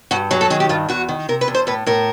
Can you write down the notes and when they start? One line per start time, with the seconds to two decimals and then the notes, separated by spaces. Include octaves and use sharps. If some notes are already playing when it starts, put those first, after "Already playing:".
0.11 G2 F#4
0.31 F#3 G#4
0.41 A4
0.50 D#3 G#4
0.60 G4
0.69 G2 F4
0.89 E2 F#4
1.09 D#3
1.29 C3 A#4
1.41 B4
1.48 E2
1.55 C5
1.67 A2 B4
1.86 A2 A#4